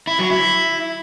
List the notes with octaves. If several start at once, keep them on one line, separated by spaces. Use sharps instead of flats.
E4
F#3
E4